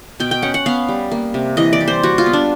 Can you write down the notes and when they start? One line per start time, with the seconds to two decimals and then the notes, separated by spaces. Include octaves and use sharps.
0.20 B2 G5
0.31 G5
0.42 C#4 F#5
0.54 F#5
0.66 B3 F5
0.88 G3
1.11 A#3
1.34 C3
1.57 E3 D#5
1.73 D5
1.81 G3
1.88 C5
2.03 G3 F#4
2.18 F4
2.26 B3
2.33 D4